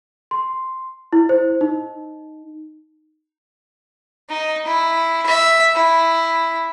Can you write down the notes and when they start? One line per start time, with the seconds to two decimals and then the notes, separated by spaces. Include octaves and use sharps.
0.31 C6
1.13 E4
1.29 C5
1.61 D#4
4.29 D#4
4.67 E4
5.26 E5
5.75 E4